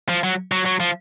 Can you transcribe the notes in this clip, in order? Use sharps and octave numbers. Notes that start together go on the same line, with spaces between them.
F3
F#3
F#3
F#3
F3